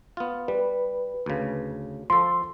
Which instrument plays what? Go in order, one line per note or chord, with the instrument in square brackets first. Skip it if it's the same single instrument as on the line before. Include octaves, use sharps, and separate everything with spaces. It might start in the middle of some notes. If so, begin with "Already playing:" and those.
[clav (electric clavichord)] B3 F4
[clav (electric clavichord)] G3 [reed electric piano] B4
[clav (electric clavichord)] D2 C#3
[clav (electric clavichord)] F3 A4 [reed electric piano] C6